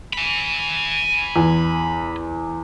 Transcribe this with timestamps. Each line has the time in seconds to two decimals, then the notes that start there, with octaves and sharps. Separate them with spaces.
0.13 G#5 B5
1.36 E2